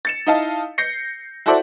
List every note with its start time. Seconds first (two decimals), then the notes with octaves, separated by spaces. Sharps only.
0.05 A6 C#7 E7
0.26 D#4 E4 D#5 F5 A5
0.78 G6 A#6 C7 C#7
1.46 E4 F#4 A4 C5 D5 E5